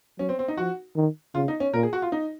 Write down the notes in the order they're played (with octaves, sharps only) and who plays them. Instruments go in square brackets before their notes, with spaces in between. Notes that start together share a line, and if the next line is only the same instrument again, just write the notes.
[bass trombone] F#3 [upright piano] C#4
[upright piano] C4
C4
D#4
[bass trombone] F3 [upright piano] F#4
[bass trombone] D#3
[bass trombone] C#3 [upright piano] F4
[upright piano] D#4
C#4
[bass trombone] A#2 [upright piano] A#4
[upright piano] G#4
F#4
F4
D#4